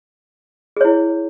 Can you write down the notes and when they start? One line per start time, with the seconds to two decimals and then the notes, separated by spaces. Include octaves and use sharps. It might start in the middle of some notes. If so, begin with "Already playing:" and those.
0.77 G#4
0.81 C#5
0.85 E4